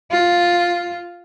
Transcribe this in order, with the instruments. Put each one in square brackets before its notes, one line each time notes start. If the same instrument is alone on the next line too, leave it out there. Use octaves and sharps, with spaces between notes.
[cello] F4